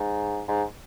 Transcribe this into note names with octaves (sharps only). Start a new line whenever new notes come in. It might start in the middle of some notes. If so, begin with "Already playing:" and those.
Already playing: G#2
G#2